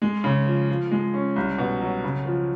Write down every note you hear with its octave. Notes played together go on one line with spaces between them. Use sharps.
G#3
C#3
F3
F3
G#3
C#4
C2
B2
F#3
C#3
F3